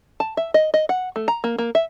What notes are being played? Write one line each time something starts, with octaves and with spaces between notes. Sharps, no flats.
A5
E5
D#5
D#5
F#5
A3
A#5
A#3
A#3
E5